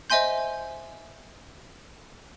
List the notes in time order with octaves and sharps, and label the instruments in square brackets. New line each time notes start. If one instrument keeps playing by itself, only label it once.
[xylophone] C5 D#5 E5 G#5 C6 G6